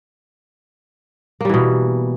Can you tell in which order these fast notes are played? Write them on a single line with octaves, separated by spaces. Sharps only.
A#3 G3 E3 B2